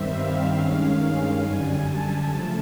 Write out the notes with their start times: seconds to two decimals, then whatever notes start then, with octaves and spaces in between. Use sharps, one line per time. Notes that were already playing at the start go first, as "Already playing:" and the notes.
Already playing: G2 D#3 G3 C4 E5
0.11 F5
0.54 G2 D#3 G#3 C#4
0.98 F5
1.42 F#2 D3 G3 G#5
1.86 A5
2.29 C#3 F3 A3